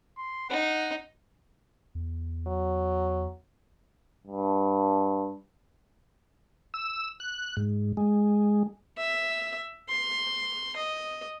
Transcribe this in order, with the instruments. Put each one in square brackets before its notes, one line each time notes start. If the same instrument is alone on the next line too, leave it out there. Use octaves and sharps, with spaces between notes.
[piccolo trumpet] C6
[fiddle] D#4 [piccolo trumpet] F#5
[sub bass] E2
[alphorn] F#3
[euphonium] G2
[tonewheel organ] E6
F#6
G#2
G#3
[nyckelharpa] E5
C6
D#5